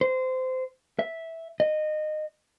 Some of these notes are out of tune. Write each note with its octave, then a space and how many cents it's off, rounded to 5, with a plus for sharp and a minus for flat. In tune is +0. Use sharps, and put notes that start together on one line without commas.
C5 -20
E5 -10
D#5 -20